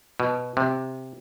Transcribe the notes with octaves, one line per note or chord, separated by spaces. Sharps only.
B2
C3